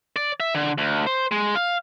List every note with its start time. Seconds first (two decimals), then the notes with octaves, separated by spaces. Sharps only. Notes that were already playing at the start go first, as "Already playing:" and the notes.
0.16 D5
0.40 E5
0.55 D3
0.78 D2
1.07 C5
1.31 G#3
1.56 F5